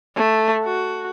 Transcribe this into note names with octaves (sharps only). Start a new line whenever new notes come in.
A3
F#4